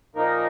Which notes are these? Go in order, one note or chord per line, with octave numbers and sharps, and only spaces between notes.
A#2 F3 A#3 D#4 A#4